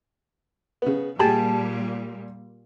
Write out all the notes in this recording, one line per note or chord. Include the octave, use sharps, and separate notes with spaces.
C#3 B3
A#2 G3 G4 G#4 A5